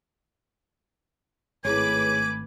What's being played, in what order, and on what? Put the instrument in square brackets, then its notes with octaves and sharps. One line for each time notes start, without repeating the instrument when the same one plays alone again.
[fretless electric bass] G#1 [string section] A2 B4 D6 [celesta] E4 G#4 C#5 [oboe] G#5